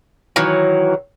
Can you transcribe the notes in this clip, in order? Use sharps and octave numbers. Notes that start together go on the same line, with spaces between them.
D#3 E3 F#3